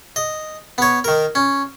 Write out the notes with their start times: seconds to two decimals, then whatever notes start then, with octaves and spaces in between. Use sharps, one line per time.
0.16 D#5
0.78 B3 C#5
1.04 D#3 A#4
1.35 C#4